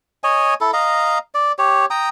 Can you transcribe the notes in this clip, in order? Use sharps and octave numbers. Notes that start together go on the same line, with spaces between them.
C#5 D#5 G#5
E4 A4
D#5 F5 A#5
D5
G4 C#5
G5 A#5 D#6